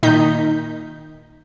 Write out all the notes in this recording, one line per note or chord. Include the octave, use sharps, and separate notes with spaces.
A#2 D#3 D#4 A#5 G6 B6